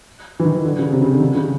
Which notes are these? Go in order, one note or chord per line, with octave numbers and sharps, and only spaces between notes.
E3
D#3
E3
D3
C#3
C3
C#3
D3
D#3
C#3